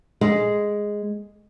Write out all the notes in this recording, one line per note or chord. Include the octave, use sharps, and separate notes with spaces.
G#3